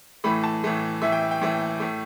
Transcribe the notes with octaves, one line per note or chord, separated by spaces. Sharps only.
A2 E3 A3 B5
A5
A2 E3 A3
A2 E3 A3 E5
G5
E5
G5
A2 E3 A3
A2 A3